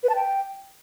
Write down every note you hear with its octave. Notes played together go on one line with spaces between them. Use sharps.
B4
A5
G5